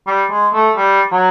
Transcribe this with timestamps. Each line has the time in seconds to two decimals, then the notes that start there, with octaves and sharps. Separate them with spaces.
0.07 G3
0.30 G#3
0.54 A3
0.76 G3
1.12 F#3